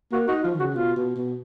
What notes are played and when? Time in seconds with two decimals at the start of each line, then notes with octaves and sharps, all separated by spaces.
0.12 A#3 F#4
0.28 D#4 F#4
0.43 F3 F4
0.54 D#3
0.59 C#3 F#4
0.74 B2 F4
0.96 B2
1.16 B2